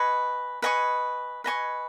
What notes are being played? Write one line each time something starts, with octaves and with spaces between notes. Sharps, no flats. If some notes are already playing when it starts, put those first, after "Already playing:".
Already playing: B4 D#5 G#5 C#6
B4 D#5 G#5 C#6
B4 D#5 G#5 C#6